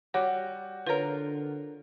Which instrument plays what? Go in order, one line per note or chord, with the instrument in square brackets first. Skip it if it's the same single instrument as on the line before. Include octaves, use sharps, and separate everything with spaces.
[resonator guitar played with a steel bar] G3 [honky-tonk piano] F#4 [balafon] C#5
[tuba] D3 [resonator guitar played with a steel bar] F4 A#4 [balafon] B4 C#5